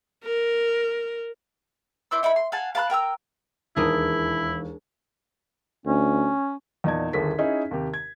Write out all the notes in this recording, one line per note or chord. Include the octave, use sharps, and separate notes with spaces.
A#4
E4 C5 D5 E6
D#4 E4 E5 B5
C6
F5 F#5 G#5 A5
F5 A5 B5 F#6
A#4 G5 A#5 E6
E1 D#2 D4 E4 G#4 A#4
D2 C#4
E2 A#2 D#4 D5 A5 G#6
G1 D#2 G#4 A4 B6
C#4 D#4 E4 G#4 D#5 E5
D#2 C3 G4
G#6